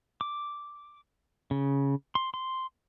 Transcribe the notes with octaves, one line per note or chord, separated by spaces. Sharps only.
D6
C#3
C6
C6